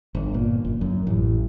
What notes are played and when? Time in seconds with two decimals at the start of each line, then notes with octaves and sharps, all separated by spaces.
0.15 G1
0.34 A#2
0.65 F#1
0.81 F#2
1.07 A1